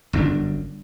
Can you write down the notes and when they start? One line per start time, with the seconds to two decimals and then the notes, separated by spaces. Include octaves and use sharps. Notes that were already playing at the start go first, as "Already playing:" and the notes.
0.13 G1 F#2 C#4 D4